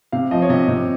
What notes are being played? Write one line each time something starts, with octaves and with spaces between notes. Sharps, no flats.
C3 F5
F3 D#5
C#5
C3 D#5
C3